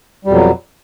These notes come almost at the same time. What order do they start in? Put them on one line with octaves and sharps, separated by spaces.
G3 F2 B2 F#3